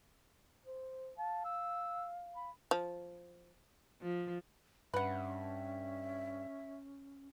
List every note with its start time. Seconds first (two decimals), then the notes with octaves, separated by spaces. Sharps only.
0.66 C5
1.18 F5 A5
1.45 E6
2.36 B5
2.71 F3
4.02 F3
4.94 G2 C#4 B4 E5 F#5